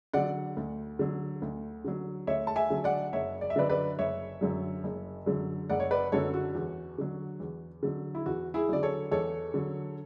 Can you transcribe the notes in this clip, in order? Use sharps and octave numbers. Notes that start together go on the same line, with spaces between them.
D3 F#3 D5 F#5
D2
D3 F#3
D2
D3 F#3
D2 C#5 E5
A5
E5 G#5
D3 F#3
D5 F#5
F#1 C#5 E5
D5
E5
F#2 D3 F#3 B4 D5
B4 D5
F#1 C#5 E5
F#2 D3 F#3
F#1
F#2 D3 F#3
F#1 D5 F#5
C#5
B4 D5
F#2 D3 F#3 A4 C#5
F#4
E2
D3 F#3
E2
D3 F#3
E4
E2 F#4
E4 G#4
D3 F#3 D5
A4 C#5
E2 A4 C#5
D3 F#3